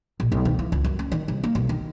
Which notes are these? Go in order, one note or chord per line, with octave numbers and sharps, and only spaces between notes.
A#1
B1
D#3
E3
C#2
F#2
C#4
D#3
C2
A#3
B1
D#3